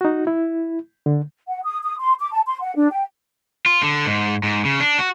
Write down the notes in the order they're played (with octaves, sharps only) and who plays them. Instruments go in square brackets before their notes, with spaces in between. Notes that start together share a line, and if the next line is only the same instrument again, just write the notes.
[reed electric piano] D#4 F#4
E4
D3
[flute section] F#5
D#6
D#6
C6
D6
A5
C6
F#5
D4
G5
[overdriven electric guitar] F4
D3
G#2
G#2
C#3
D4
F#4